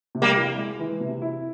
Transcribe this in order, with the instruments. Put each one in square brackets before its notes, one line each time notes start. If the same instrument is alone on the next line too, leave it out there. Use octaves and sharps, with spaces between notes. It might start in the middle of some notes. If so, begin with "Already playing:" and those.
[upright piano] C3
[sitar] G3 A#3
[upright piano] E4
G#3
E3
C3
E4